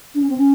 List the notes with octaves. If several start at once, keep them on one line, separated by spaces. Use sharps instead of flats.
D4
C#4
C4
C#4